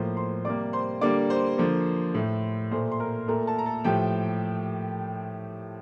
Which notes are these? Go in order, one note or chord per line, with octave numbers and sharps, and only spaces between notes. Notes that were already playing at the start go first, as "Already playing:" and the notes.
Already playing: A2 F3 A#3 C5 C6
C5 C6
C3 G3 A#3 D5 D6
C5 C6
D3 G3 A#3 D5 D6
C5 C6
D3 F3 A#3
A2 A3
A#2 A3 C5 C6
C6
A#4 A#5
A#2 A3 A#4 A#5
A4 A5
A#5
A4 A5
A2 F3 A3 G4 G5